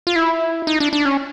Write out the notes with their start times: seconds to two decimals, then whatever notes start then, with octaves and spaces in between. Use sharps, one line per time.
0.07 F4
0.16 E4
0.67 D#4
0.80 D4
0.93 D4
1.05 C#4